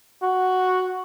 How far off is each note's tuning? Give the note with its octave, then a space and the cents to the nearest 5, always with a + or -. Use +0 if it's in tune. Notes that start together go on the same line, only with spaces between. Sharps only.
F#4 +0